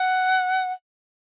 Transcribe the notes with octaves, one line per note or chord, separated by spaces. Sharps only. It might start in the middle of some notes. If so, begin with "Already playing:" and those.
Already playing: F#5